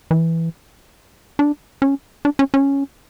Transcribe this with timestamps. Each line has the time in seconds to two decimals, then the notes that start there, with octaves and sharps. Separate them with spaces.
0.11 E3
1.39 D4
1.82 C#4
2.25 D4
2.39 C#4
2.54 C#4